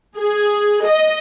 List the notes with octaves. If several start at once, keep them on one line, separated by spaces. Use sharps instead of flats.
G#4
D#5